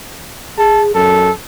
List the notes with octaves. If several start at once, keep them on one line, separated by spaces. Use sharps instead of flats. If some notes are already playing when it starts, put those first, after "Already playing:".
G#4 A5
F#2 A4